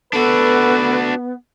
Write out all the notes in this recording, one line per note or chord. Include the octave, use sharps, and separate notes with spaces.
B3 D4 F#4 A4 B4